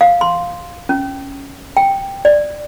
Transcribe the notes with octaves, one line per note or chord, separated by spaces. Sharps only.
F5
C6
C#4
G5
D5